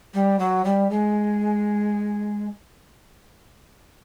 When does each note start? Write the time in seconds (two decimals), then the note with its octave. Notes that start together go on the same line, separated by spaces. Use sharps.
0.14 G3
0.39 F#3
0.64 G3
0.90 G#3